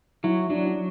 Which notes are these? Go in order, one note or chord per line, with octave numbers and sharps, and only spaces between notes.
F#3 E4
F#3 D4
D4